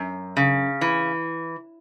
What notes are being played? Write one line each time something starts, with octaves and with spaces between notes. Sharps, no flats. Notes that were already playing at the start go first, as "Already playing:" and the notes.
Already playing: F#2
C#3
E3